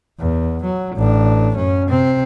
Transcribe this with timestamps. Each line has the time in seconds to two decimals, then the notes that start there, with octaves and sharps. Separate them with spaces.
0.20 E2
0.63 F#3
0.96 A1 D4
1.56 F#2 C#4
1.88 C3 C4